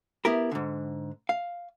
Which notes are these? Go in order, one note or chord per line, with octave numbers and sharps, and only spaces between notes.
B3 E4 G4 A#4
G#2 D3
F5